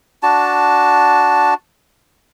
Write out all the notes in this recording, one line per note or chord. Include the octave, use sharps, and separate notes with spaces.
D4 F#4 A5